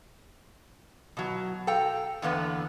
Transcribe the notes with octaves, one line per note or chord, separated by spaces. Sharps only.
B2 F#3
A4 F5 G5 A#5
E2 D3 A#3 B3